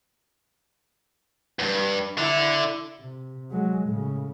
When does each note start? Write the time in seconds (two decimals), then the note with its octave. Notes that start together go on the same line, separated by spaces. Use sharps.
1.59 E2 G2
2.18 D3 D4 E4
3.00 C3
3.51 F#3 G#3
3.88 A2 C#3